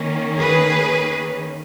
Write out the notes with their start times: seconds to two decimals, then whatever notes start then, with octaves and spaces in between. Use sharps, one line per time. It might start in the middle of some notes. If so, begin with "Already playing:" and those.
Already playing: D#3 A#3 C#4
0.39 G#4 B4